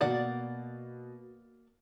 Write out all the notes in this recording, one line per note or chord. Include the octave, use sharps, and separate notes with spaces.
B2 A#3 D5 F#5 A6